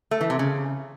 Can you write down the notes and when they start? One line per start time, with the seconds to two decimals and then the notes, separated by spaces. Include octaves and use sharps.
0.11 A3
0.21 E3
0.30 C3
0.39 C#3